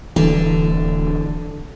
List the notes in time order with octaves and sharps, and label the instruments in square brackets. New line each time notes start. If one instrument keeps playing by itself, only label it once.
[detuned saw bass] D1 [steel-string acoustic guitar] D3 [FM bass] E3